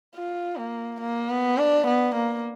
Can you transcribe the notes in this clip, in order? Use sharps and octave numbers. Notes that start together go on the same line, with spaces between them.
F4
A#3
A#3
B3
D4
B3
A#3